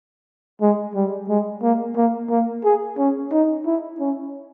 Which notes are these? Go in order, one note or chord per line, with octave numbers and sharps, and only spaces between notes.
G#3
G3
G#3
A#3
A#3
A#3
G#4
C#4
D#4
E4
C#4